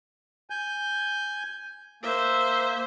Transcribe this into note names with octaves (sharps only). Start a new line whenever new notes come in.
G#5 G6
A#3 C5 E5